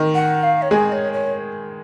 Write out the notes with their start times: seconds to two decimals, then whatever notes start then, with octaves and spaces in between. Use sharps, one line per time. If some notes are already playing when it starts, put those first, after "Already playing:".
Already playing: D#3 D#4
0.14 F#5
0.43 F5
0.62 C#5
0.71 G#3 G#4 D#5
0.92 C#5
1.13 C#5